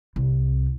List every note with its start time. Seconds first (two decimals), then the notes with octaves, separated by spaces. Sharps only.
0.16 C2